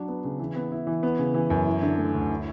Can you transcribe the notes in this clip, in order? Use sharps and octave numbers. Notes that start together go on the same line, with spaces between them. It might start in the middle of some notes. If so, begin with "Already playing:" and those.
Already playing: F#3 D4
B3
C#3
E3
B3
E4
E3
B3
C#3
E3
F#2
E4
D3
A3
D2
E4